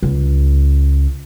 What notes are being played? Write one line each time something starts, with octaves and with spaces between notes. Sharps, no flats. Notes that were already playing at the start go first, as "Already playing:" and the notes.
C#2